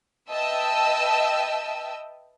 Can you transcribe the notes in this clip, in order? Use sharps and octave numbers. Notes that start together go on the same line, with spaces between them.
B4 D#5 E5 G5 A5 E6